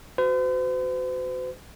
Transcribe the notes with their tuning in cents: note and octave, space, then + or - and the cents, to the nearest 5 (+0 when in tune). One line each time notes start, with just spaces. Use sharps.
F#4 +0 C5 -45